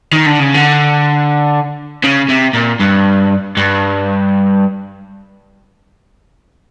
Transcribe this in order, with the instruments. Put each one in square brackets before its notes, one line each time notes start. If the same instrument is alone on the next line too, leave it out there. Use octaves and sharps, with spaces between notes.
[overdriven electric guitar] D#3
D3
C#3
D3
C#3
C3
A#2
G2
G2